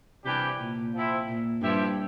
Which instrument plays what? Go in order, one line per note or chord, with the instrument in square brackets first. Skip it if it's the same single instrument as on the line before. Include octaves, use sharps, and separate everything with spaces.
[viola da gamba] C3 [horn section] E3 G3 D4 G4
[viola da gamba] A#2
[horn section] F3 C4 E4
[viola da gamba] A#2
[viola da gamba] G2 [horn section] F3 C4 E4 G4